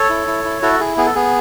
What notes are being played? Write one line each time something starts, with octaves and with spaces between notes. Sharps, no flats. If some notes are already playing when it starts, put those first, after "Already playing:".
Already playing: A4 C#5
E4
E4
E4
E4 F#4 A4
E4 G#4
B3 G#4
A4
B3 G#4